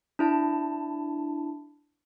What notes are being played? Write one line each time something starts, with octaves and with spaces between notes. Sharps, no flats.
D4 E4 A5